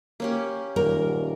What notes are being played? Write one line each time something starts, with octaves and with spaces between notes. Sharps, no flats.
A#3 C#4 G4
D#1 A#4